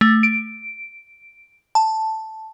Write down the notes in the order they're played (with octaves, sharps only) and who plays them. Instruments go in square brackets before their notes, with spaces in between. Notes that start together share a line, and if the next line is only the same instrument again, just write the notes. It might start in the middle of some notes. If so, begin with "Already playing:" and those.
[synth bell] A3
D7
A5